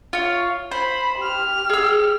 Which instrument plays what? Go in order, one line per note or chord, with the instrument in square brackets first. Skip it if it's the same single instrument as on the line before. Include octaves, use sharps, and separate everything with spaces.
[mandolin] F4 C#5
[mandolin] C5 [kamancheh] B5
[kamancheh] G4 F6
[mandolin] G#4 E6